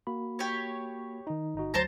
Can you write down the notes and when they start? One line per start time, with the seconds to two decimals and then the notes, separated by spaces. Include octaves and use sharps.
0.07 A#3 F#4 B5
0.39 G4 C#5
1.27 D#3 D#4
1.55 G1 D#4 F#4
1.74 D2 F#3 C5 A5 A#5